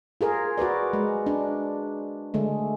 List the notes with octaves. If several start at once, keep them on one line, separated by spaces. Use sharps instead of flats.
F4 G#4 A#4
F#4 A#4 B4 D5
G#3
D4
D3 G#3 A3